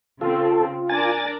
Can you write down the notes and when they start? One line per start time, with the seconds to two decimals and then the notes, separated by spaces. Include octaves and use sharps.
0.21 C#3 C4 F4 A4
0.89 D4 A#4 D5 G#5 A6